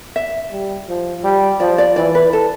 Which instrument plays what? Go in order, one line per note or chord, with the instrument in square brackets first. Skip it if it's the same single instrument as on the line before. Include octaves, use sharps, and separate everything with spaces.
[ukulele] E5
[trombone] G3
F3
G3
[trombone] F3 [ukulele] D5
[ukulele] D5
[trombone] E3 [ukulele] D5
[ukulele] B4
A4